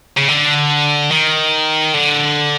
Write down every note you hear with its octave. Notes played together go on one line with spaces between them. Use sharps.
C#3
D3
D#3
D3